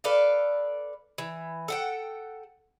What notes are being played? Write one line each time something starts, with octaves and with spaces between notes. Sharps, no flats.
A4 B4 D5 F5
E3
A4 F#5 G5